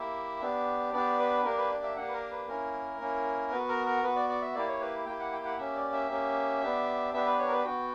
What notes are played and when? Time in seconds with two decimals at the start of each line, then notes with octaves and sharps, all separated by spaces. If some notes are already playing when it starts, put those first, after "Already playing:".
Already playing: A#3 E4 G4 E5
0.41 B3 D4 G4
0.93 B3 D4 G4 D5
1.19 B4
1.44 A#3 D4 G4 A#4
1.58 B4
1.70 D5
1.83 E5
1.96 A#3 D4 G4 F#5
2.08 B4
2.13 A#4
2.31 B4
2.48 A#3 C#4 E4 A#4
3.00 A#3 C#4 E4
3.51 B3 F#4 B4
3.69 A#4
3.86 A#4
4.03 B3 F#4 B4
4.16 D5
4.29 D5
4.42 E5
4.55 A#3 E4 G4 D5
4.68 C#5
4.81 B4
5.07 A#3 E4 G4 G5
5.20 F#5
5.33 G5
5.45 F#5
5.58 A#3 C#4 G4 E5
5.76 D5
5.93 E5
6.10 A#3 C#4 G4
6.62 B3 D4 G4
7.13 B3 D4 G4 E5
7.26 B4
7.39 C#5
7.46 A#4
7.52 B4
7.65 B3 F#4 G5